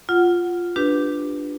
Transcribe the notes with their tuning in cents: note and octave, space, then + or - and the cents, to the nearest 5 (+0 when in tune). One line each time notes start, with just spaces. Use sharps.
F4 +0 F#5 +0
D4 +0 G4 -10 B4 +0